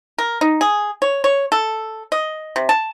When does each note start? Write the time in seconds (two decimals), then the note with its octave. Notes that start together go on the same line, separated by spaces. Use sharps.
0.18 A#4
0.41 D#4
0.61 G#4
1.02 C#5
1.24 C#5
1.52 A4
2.12 D#5
2.56 C3
2.69 A5